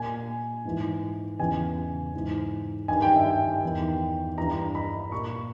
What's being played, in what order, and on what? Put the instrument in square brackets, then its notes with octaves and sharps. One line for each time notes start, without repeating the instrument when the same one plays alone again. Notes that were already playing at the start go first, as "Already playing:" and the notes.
Already playing: [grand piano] A#2 G#5
G#2 E3
E2 C#3 E3 G#5
G#2 E3
G2 D#3 G#5
G5
E5
G5
E2 D#3
G2 E3 A#5
B5
A#2 C#6